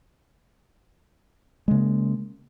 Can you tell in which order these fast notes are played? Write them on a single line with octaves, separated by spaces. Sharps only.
G#3 C#3 A#3